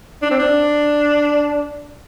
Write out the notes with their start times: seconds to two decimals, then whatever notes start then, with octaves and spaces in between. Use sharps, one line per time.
0.22 D4
0.31 C4
0.39 D4